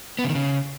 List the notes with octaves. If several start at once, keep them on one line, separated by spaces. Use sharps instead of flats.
B3
C#3
D#3
C#3